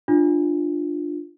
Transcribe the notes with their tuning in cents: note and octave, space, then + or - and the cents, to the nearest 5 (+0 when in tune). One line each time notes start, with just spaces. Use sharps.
D4 +15 F4 +0